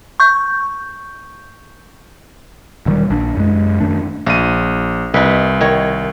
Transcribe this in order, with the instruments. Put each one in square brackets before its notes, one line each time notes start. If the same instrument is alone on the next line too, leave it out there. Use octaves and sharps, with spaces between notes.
[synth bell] C#6 G6
[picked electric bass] E1 D#3 G3
A#1 D4
F#2 G#3
F#2 D#3 A3 D4
[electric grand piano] A#1 D#7 [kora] F4
[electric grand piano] C2 [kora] D#4 B4
[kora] D#3 C#5